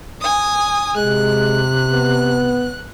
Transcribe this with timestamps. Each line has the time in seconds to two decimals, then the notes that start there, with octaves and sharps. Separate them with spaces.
0.21 G#5 D#6
0.96 C3 G#3 F#6
1.92 B3